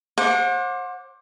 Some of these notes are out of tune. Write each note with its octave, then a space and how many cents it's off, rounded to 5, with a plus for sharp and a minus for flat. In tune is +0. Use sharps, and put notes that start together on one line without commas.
C5 +35 F#5 -35 D6 +0